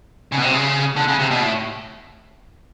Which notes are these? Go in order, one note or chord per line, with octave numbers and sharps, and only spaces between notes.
C#3
B2
C3
C#3
D3
C#3
C3
B2
A2